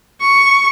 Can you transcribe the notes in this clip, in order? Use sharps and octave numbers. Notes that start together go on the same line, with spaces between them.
C#6